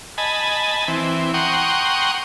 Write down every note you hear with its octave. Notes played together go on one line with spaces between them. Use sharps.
D#5 G#5 A5 B5
E3 C4
F#5 G5 A#5 C6 C#6 D#6